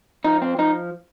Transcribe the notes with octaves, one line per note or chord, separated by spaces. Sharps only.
F3 D#4
C4
F3 D#4